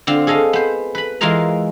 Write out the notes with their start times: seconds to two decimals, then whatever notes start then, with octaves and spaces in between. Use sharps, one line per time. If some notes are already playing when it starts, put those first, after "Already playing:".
0.07 D3 C4 F4
0.27 G#4 A4 D#5 F5
0.53 B3 C5
0.95 B4 B5
1.21 E3 G#3 F4 G#4 A#4 A#5